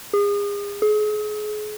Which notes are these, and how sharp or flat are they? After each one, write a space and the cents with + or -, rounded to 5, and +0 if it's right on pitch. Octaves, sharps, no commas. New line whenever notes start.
G#4 -35
G#4 +35